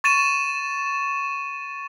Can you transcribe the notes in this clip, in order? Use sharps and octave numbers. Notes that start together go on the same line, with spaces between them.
C#6 A6 D#7 E7